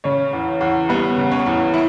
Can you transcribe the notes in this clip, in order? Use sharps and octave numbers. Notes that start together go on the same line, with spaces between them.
C#3 C#4 C#5
E2
E2
G3 B3 B4
C#3
C#4 C#5
E2
E4